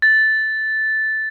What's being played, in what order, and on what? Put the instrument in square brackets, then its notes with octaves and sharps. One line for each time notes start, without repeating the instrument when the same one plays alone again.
[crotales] A6